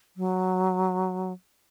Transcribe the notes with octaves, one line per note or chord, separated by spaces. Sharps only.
F#3